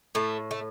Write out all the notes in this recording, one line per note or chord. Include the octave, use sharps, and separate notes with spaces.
A2 A3
A3